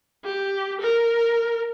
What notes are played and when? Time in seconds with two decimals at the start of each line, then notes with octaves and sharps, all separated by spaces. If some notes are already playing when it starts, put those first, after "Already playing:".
0.24 G4
0.80 A#4